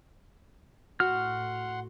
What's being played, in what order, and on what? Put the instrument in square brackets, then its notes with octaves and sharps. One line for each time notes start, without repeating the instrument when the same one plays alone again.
[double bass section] A2 [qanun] F#4 [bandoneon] F#5 C6 [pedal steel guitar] F6